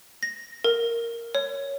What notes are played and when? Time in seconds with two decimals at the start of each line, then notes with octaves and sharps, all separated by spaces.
0.23 A#6
0.64 A#4
1.35 C#5